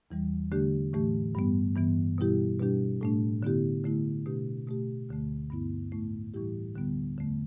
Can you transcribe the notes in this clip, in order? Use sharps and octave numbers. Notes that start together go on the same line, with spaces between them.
E2 E3 G3
D3 A3 D4 G4
A2 E3 A3 G4
G2 G3 B3
G2 E3 B3
B2 G3 E4 G4
B2 G3 D4 G4
A2 A3 D4
D3 B3 E4 G4
D3 A3 E4
B2 A3 D4 G4
B2 A3 G4
D2 D3 A3
G2 D3 B3 E4
A2 A3 E4
A2 E3 G3 E4 G4
D2 D3 G3 B3
E2 D3 A3